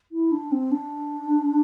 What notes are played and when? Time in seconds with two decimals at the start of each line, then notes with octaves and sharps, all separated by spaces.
0.12 E4
0.32 D4
0.52 C4
0.72 D4